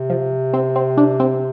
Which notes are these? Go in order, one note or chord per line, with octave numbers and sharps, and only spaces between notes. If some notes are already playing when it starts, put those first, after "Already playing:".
Already playing: C3
F3
C4
C4
D4
C4